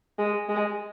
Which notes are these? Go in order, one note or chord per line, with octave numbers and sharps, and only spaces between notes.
G#3
G#3